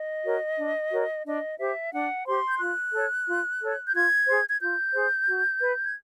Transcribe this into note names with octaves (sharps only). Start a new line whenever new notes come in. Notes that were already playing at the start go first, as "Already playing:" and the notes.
Already playing: D#5
F#4 A#4 C#5
D4
F#4 A#4 C#5
D4 D#5
G4 C5 E5
D4 F#5
G4 C5 C6
G6
F4 F#6
A4 C#5
F4
A4 C#5
G6
F4 G#6
G#4 C5
G#6
F4 G6
G#4 C5
F#4
B4
G#6